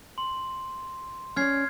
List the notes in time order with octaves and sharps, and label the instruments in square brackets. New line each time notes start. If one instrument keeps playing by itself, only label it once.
[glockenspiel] C6
[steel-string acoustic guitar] C#4 D5 [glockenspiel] F6 G#6 C7